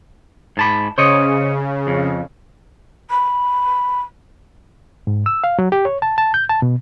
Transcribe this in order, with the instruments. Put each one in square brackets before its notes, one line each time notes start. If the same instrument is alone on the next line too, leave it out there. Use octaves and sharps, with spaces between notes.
[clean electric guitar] G#2 A5 B5
[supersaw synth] C#3 [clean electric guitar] C5 C#5 D#5
[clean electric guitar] F2
[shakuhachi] B5
[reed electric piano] G#2
E6
F5
F#3
G4
C#5
A5
A5
G6
A5
B2